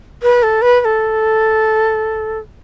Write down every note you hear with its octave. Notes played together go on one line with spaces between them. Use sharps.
B4
A4
B4
B4
A4